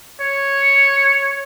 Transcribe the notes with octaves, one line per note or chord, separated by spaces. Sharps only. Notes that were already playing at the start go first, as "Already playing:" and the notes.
C#5